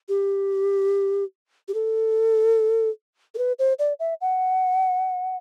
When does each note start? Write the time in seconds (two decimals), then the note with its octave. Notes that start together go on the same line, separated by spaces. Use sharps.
0.09 G4
1.68 G4
1.74 A4
3.35 A4
3.38 B4
3.59 C5
3.79 D5
4.00 E5
4.21 F#5